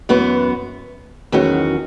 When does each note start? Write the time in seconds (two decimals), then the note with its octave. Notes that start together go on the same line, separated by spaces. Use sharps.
0.09 F#2 E3 B3 F#4
1.32 E2 D#3 F#3 C#4 F#4